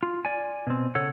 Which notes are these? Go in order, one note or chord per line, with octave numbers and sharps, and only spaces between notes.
F4
D5 G#5
B2 C4
C#3 A4 C#5 F#5